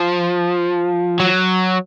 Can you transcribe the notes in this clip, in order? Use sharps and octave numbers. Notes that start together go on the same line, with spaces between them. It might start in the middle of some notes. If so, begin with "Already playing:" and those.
Already playing: F3
F#3